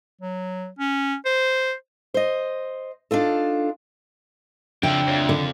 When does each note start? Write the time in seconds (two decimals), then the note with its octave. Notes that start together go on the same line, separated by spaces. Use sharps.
0.21 F#3
0.79 C#4
1.26 C5
2.14 C5 D#5
3.11 D4 D#4 F4 A4
4.83 F2 C#3 F3 D4 E5 G5
5.07 F2 C#5
5.29 D3